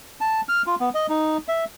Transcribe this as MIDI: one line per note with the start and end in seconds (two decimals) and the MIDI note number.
0.21 0.41 81
0.49 0.62 89
0.67 0.75 65
0.80 0.89 59
0.95 1.07 75
1.09 1.37 63
1.48 1.65 76